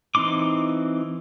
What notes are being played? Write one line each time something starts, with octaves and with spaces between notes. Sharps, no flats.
E3 C4 D#4 C6 D6